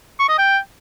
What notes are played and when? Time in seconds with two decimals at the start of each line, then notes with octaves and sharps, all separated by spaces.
0.19 C#6
0.29 D#5
0.38 G5